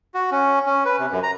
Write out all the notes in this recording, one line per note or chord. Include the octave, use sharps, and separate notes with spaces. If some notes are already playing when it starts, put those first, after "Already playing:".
F#4
C#4
C#4
B4
C3
F#2
A#5